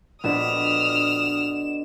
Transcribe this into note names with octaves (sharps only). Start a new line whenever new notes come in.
A#1 B2 D3 D#6 F6 E7